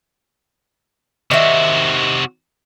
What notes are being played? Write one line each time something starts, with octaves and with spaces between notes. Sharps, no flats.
C3 D#3 F#4 E5